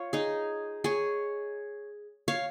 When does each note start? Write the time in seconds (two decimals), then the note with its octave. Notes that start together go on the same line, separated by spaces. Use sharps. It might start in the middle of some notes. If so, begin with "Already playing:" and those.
Already playing: F4 C#5
0.13 D#4 G#4
0.84 G#4 C#5
2.28 C#5 F5